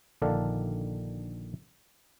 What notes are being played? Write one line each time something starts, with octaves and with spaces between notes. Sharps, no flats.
A#1 D3 D#3 D4 A4 F5